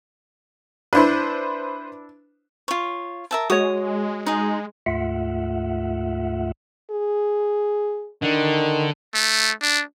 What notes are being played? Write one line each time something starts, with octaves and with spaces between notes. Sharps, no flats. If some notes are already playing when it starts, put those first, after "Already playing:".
D4 E4 B4 C5 C6
F4 C#5
A#4 E5 A5
G#3 F#4 C#5 D#6
D#4 G#4
D2 G#2 A3 F4 E5 F#5
G#4
D3 D#3
A3
D4